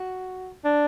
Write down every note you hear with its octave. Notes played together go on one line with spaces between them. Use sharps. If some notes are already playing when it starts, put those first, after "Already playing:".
Already playing: F#4
D4